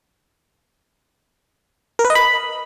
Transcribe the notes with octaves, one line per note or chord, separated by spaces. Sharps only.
A#4
B4
D#5
B5